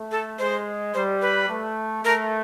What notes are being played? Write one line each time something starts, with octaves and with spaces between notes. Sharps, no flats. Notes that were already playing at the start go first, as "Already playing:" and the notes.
Already playing: A3
A4
G#3 C5
G3 C5
B4
A3
A3 A#4